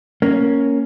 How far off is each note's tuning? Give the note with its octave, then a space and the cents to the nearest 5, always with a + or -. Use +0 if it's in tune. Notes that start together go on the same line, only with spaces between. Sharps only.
A#3 +0 C#4 +0